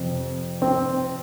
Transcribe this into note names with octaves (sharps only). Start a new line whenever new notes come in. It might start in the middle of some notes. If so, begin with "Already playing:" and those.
Already playing: F2 C3
C4